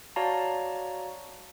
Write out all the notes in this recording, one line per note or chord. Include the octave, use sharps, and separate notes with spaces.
F#4 C#5 D5 F5 A5 A#5